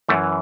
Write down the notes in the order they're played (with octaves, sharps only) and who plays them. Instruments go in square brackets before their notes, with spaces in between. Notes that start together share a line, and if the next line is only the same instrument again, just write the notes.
[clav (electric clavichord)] F#2 E3 A3